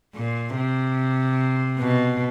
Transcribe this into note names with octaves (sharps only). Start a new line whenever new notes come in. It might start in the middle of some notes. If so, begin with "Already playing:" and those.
A#2
C3
B2